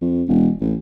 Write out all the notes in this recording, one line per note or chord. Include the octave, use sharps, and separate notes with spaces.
F2
E1
A1